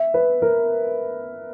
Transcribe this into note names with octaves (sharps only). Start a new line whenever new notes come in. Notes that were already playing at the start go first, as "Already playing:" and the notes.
Already playing: E5
B4
A#4